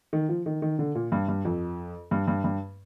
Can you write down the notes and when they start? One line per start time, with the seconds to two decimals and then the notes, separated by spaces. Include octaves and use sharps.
0.13 D#3
0.29 F3
0.46 D#3
0.62 D#3
0.79 D3
0.95 A#2
1.12 G2
1.28 G2
1.45 F2
2.11 G2
2.27 G2
2.44 G2